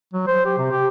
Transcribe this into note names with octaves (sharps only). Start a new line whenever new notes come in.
F#3
C5
G4
C3
G4